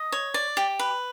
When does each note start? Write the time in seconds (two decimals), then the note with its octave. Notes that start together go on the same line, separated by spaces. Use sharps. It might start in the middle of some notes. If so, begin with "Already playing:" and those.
Already playing: D#5
0.12 C#5
0.34 D5
0.57 G4
0.79 B4